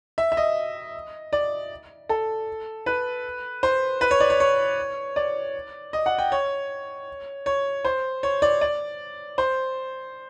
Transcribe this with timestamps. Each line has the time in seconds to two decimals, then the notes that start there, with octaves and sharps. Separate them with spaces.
0.18 E5
0.32 E5
0.37 D#5
1.33 D5
2.09 A4
2.86 B4
3.63 C5
4.01 B4
4.11 C#5
4.20 D5
4.30 C#5
4.40 C#5
5.16 D5
5.93 D#5
6.06 F#5
6.18 G5
6.32 C#5
7.46 C#5
7.85 C5
8.23 C#5
8.42 D5
8.61 D5
9.38 C5